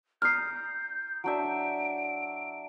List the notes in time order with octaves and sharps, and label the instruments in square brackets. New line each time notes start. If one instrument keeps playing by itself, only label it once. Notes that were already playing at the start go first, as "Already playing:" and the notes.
[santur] A#5 D6 D#6 [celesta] F6 C7 [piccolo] G6
[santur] F#3 D4 E5 [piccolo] D7